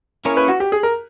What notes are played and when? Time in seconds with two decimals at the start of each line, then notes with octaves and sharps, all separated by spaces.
0.25 A#3 C#4 E4 G#4 A#4 C#5
0.37 B4
0.48 F#4
0.60 G4
0.72 G#4
0.83 A#4